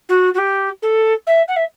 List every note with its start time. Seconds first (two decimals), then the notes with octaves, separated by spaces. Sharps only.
0.09 F#4
0.34 F#4
0.38 G4
0.82 A4
1.26 E5
1.48 F#5
1.56 E5